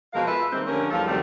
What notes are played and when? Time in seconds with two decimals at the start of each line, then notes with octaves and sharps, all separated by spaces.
0.13 B2 F3 G#3 A#4 F5
0.26 F4 G#4 A4 B4 E5
0.52 D#3 G3 G#3 A#3 C4
0.67 D3 F3 A3 C#4 G4 A#4
0.91 E2 F3 G3 A4 F5
1.06 D#2 C3 F#3 G3 A3 G4